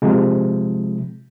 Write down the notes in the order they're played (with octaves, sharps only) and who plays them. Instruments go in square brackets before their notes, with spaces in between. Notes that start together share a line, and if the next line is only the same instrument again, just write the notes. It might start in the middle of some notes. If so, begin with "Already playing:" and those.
[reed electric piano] C3 F3 G#3